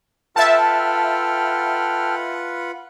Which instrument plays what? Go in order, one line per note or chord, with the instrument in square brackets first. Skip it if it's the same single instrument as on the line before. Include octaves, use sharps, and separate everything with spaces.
[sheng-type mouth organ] F4 B4 F#5 [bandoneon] A4 G5 F6 [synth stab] E5 A5